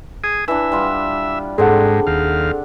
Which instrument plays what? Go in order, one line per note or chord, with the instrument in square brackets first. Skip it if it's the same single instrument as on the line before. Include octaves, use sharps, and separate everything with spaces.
[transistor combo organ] G#4 D#6
[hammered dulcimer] E3 D4 [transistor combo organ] E5
[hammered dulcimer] G3 F4 F#5
[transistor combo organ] G#2 [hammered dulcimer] C4 D4 [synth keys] G#4 A4 F#5
[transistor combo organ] D#2 F5